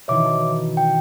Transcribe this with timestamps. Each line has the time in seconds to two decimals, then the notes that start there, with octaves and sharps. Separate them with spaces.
0.08 B2 D#3 E3 C#5 E5 D6
0.25 A5
0.77 G5